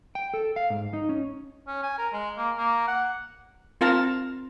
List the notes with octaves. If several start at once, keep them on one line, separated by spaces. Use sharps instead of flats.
G5
A4
F5
G#2
D#4
C#4
C#4
G#5
A#4
G#3
A#3
A#3
F#5
C4 F4 A#4 F5 A5 A#5